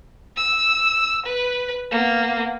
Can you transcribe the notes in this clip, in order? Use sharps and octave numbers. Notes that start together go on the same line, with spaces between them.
E6
B4
A#3 B3